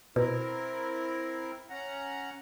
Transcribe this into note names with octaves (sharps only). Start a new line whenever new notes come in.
B2 C4 E4 A#4
C#4 F#5 A#5